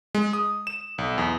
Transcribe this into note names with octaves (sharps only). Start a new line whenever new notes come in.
G#3
D#6
E7
B1
E2